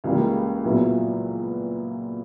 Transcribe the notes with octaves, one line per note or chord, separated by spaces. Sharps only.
C#2 C#3 E3 G3 A#3
A#2 F#3 B3 E4